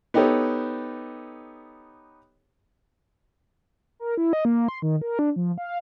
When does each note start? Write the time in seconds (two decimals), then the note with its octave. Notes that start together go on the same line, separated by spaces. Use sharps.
0.14 B3 D#4 G4 A4 C#5
3.99 A#4
4.17 E4
4.33 D#5
4.45 A#3
4.68 C6
4.82 D#3
5.02 A#4
5.19 D4
5.36 F3
5.58 F5